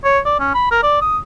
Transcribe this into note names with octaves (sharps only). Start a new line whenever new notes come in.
C#5
D5
C#4
B5
A#4
D5
D#6